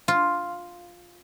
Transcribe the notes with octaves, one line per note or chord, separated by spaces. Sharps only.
F4